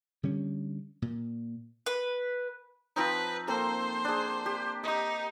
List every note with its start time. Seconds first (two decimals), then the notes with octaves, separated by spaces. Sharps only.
0.23 D3 G3 C#4
1.02 A#2
1.86 B4
2.96 F3 C4 D#4 B4
3.48 A#3 C4 A4 C5
4.05 D4 G#4
4.46 G4
4.83 D#4 D#5 D#6